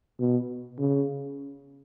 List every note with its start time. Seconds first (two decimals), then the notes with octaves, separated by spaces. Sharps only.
0.20 B2
0.79 C#3